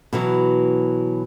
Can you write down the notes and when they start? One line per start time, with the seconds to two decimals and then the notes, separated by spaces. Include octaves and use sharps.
0.13 B2 E3 F#3